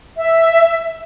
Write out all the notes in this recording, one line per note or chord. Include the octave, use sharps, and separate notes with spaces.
E5